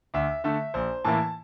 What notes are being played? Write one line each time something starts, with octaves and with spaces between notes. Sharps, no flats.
D2 E5
D3 A3 E5
A#1 C5
A2 E3 A#3 E4 A5